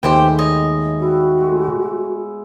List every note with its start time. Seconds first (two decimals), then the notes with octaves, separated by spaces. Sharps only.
0.03 D#2 G#3 A3 B3 G4 B4 C5 G5
0.39 C#5 D#5
1.00 G3 E4 F#4
1.38 A2 G#3 B3